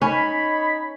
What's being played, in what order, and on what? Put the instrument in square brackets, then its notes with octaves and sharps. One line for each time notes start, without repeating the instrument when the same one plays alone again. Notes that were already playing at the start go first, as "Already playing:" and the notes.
[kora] C#4 [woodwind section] D#4 C#5 B5